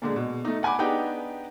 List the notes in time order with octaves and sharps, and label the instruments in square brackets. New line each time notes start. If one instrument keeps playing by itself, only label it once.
[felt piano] A#2 D3 G#3
B2
A3 D#4
F#5 G#5 B5 D6
B3 D4 D#4 G4 G#4 G5